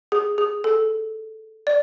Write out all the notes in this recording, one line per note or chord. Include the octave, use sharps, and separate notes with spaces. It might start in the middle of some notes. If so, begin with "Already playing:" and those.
G#4
G#4
A4
D5